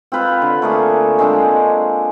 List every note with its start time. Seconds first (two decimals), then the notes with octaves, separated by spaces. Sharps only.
0.12 C4 F4 B4 F5
0.42 D3
0.62 A3 A#3 G#4
1.19 G#3 C4 D4 C5